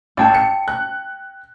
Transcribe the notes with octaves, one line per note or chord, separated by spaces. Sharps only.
A1 F5 G5 A5
C#7
F#6